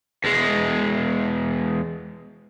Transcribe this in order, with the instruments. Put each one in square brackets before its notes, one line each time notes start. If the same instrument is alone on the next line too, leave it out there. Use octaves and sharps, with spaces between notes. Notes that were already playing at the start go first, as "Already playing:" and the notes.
[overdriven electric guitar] E2 G#3